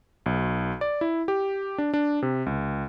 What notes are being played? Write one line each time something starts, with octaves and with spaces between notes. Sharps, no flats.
B1
D5
E4
G4
D4
D4
C3
C#2